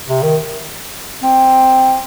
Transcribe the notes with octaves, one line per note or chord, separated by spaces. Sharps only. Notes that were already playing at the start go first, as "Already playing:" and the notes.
C3
D#3
C4